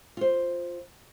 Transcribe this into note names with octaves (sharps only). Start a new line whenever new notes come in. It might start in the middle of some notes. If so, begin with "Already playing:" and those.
F4 C5